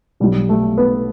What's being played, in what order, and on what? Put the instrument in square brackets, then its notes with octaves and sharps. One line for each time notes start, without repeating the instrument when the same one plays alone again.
[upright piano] B1 B2 G3
A3
B3